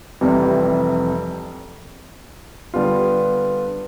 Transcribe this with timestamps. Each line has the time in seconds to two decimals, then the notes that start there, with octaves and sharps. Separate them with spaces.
0.21 F1 F2 C3 E3 G3
2.74 D3 G3 B3 F4